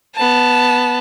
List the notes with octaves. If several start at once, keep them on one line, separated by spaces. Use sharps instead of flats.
B3 A5